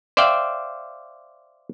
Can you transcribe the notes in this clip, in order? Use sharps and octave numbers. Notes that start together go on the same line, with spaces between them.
C5 D5 E5 F5 G5